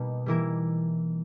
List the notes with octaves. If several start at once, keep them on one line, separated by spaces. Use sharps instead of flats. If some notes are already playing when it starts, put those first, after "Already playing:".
Already playing: B2 G3 A#3 D#4
E3 G3 A#3 E4 A#4